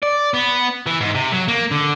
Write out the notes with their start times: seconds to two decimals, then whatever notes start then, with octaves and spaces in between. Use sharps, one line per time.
0.03 D5
0.34 B3
0.87 E3
1.01 G#2
1.15 C3
1.32 F#3
1.48 A#3
1.71 D3